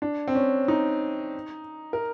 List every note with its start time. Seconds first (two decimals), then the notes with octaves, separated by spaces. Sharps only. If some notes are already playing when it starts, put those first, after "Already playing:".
0.02 D4
0.28 C4
0.35 C#4
0.68 D#4
1.93 A#4